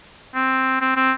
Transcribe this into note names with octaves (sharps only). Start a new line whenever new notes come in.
C4
C4
C4